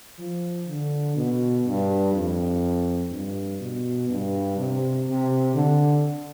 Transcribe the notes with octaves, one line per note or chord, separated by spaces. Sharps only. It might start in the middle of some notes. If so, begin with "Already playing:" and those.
F3
D3
B2
G2
F2
G2
B2
G2
C3
C3
D3